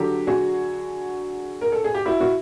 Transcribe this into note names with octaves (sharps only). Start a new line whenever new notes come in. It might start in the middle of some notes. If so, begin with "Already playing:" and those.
Already playing: D3 F#3 G4 A4
F#4 G#4
A#4
A4
G#4
G4
E4 F#4
F#4